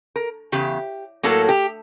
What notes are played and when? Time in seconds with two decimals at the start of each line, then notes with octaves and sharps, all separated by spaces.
0.16 A#4
0.52 E2 C#3 G4
1.23 A2 F#3 A#3 A4
1.49 G4